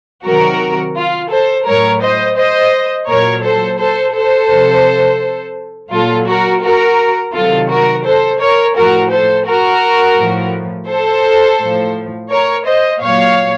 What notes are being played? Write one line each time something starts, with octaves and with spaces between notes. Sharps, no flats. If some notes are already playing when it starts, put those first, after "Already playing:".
C3 D#3 F#3 F#4 A#4
F4
A4 C5
A2 F#3 A#4 C#5
C5 D#5
C5 D#5
A#2 F#3 A#4 C#5
A4 C5
A4 C5
A4 C5
C3 F3
A#2 F#3 F4 A4
F#4 A#4
F#4 A#4
C3 D#3 F#3 F4 A4
F#4 A#4
A4 C5
A#4 C#5
A2 F3 F#4 A#4
A4 C5
F#4 A#4
A2 F3
A4 C5
A2 F3
A#4 C#5
C5 D#5
A#2 F#3 C#5 F5